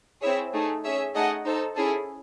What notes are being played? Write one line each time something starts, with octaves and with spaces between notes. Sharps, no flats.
C4 E4 G#4 C#5 E5
A3 D#4 G#4
C#4 G#4 C#5 E5
A3 D#4 G#4 D#5 F#5
D#4 A4 C5
C#4 E4 G#4 A4